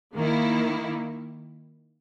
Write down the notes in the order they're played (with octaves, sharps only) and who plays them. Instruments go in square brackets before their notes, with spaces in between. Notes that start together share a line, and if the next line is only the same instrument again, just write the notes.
[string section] D#3 A#3 E4